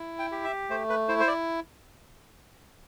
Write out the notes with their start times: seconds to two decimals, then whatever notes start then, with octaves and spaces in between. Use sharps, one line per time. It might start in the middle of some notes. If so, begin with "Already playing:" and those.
Already playing: E4
0.19 G5
0.32 G4
0.44 E5
0.70 A3 C5
0.90 B4
1.08 E4 C5
1.20 C5
1.28 D5